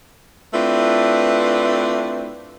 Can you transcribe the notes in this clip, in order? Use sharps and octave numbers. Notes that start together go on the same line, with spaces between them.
A3 C4 D4 E4 F4 B4